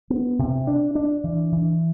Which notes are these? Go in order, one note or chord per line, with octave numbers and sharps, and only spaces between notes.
B3
C3
D4
D4
E3
E3